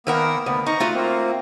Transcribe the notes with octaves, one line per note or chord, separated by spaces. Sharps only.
D#3 A#3 B3 A#4 F#5 E6
D2 B3
D#4 A#5 C#6
A3 F4 F#4
A#3 C4